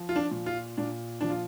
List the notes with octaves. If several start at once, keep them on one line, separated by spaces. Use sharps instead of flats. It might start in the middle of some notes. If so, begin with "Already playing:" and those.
Already playing: F3
F4
D4
A#2
F4
A#2 D4
F3 D4
F4